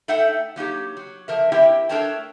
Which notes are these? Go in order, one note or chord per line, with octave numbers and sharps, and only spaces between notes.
A3 D#4 A4 E5 F#5 G5
F#3 A#3 D#4 G4
F#3
F3 A#4 E5
C4 E4 G4 A#4 E5 G5
A3 D4 A#4 C#5 G5 A5